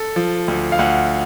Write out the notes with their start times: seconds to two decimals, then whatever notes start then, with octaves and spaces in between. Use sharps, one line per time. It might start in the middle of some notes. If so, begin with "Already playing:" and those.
Already playing: A4
0.16 F3
0.48 D2
0.72 F5
0.79 D2 F#5